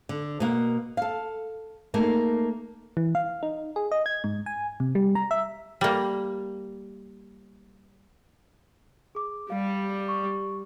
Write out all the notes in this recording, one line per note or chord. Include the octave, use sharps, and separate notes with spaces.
D3
B2 A#3 F#5
A4 F5
A3 A#3 D#4 G#4 A#4
E3
F5
D#4
G#4
D#5
G#6
G#2
G#5
C3
G3
A#5
E5
G3 A#3
G#4 D6
G3 F5
C#6